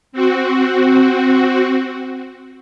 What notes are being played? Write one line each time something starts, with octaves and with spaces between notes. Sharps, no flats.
C4 F#4